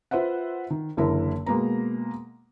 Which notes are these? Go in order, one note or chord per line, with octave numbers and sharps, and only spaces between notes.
F4 B4 C5 E5 F#5
D#3
F#1 D3 E3 E4 A#4
B2 G#3 A#3 B4 A#5